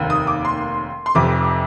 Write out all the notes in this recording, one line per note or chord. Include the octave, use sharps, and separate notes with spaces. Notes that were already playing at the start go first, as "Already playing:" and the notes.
Already playing: F1 D#2 D#3
D#6
D6
C6
C6
F1 F2 C3 D6